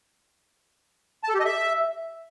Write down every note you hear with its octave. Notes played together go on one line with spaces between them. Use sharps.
A5
A4
G4
D#5
E5